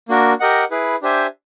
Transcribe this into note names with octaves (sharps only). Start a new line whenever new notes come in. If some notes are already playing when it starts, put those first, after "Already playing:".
A#3 D4 F#4 A#4
G4 A#4 D#5 F#5
E4 G#4 B4
D4 G4 C5 E5 G#5